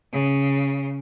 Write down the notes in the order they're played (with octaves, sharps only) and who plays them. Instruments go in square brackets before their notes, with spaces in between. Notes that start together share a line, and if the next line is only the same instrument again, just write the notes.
[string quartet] C#3